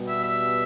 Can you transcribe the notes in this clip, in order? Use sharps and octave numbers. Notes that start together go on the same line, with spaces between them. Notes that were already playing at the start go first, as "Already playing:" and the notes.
Already playing: B2 G3 B3
E5
E5